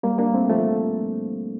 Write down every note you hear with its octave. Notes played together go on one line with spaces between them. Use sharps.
G3 A#3
A#3 D4
A3 C4
F3 A3